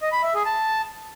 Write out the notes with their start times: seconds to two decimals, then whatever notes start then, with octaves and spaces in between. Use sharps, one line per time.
0.01 D#5
0.12 B5
0.23 E5
0.34 G#4
0.45 A5